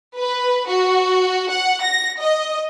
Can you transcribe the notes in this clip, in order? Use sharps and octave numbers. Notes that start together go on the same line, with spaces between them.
B4
F#4
F#5
A#6
D#5